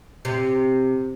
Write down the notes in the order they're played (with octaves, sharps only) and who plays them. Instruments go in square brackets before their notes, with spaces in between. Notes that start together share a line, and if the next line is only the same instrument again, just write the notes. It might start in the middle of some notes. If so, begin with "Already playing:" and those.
[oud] C3